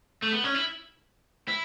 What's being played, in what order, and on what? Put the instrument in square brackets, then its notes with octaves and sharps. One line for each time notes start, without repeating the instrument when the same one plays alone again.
[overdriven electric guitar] A3
B3
C#4
E4
E4